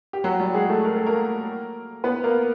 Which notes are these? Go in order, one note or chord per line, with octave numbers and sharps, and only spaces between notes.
G4
F#3 F#4
G3 G4
G#3 G#4
A3 A4
A#4
A4
A#3 A#4
B3 B4
A#3 A#4